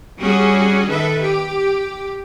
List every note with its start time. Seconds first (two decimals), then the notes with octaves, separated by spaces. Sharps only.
0.19 G3 C#4 F#4 G#4
0.89 D#3 A4 B4 E5
1.21 G4